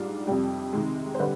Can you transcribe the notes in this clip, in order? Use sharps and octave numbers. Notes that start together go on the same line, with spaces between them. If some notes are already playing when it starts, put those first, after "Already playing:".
Already playing: G#2 G3 D4 F4
F2 C3 G3 G4
C3 D#3 G#3
C5
D3 G3 B4